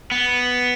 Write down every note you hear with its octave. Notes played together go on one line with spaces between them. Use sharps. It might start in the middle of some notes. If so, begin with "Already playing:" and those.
B3